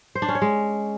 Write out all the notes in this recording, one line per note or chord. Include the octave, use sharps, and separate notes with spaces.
C5
D4
C#4
C#5
G#3